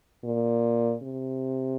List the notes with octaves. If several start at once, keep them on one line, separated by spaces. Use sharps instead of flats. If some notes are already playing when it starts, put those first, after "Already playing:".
A#2
C3